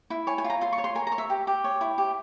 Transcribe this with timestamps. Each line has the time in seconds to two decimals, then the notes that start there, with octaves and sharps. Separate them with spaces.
0.10 E4
0.27 C#5 G#5
0.38 G#5
0.45 F4
0.50 A#5
0.61 F4 C6
0.72 C#6
0.78 C#5
0.84 C6
0.95 A#4 G#5
1.07 A#5
1.12 C#5
1.18 E5
1.30 G4
1.47 G4
1.64 C#5
1.81 E4
1.98 G4